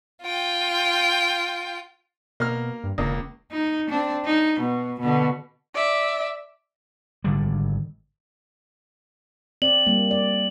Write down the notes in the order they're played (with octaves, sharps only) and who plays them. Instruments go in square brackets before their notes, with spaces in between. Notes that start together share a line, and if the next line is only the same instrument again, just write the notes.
[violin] F4 G5
[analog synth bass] B2 [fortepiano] A#3 F6
[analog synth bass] G2
[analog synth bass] E1 [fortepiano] C#2 A#3
[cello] D#4
C4 D4
D#4
B2
B2 D3
[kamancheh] D5 E5
[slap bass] G#1 D3 G3
[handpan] C4 D5 [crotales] F#7
[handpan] G3 A#3
D5